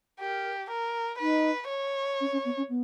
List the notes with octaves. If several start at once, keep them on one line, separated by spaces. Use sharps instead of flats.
G4 A#4
A#4
D#4 B4
C#5
C#4
C#4
B3
C#4
B3